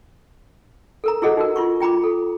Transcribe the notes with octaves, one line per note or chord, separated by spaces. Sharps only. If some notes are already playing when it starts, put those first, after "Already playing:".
A4 A#4 A#5
E4 F#4 G#4 A4 D#5 F#5
D#4 F#4 A#4
F4 C6 C#6
F4 G5 A#5 B5 D6
A4